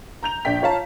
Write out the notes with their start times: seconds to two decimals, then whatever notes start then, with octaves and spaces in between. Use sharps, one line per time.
0.23 A#5 G6 F7
0.45 A#1 D4 G5 B6
0.62 F4 C#5 F5 A5 A#5